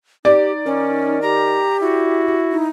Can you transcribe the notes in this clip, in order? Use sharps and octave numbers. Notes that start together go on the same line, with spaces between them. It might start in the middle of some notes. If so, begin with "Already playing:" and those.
D#4 G4 D5
D#3 C#4
G4 A#5
E4 F#4
D#4